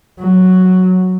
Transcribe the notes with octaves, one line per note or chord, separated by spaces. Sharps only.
F#3